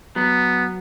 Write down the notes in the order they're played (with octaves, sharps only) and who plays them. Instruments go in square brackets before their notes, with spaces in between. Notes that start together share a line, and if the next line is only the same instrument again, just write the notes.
[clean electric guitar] F#3 [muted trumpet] B3